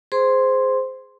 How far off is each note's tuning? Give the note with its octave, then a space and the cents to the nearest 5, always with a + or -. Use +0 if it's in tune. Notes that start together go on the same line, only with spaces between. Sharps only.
G#4 +0 C5 -10 C6 +0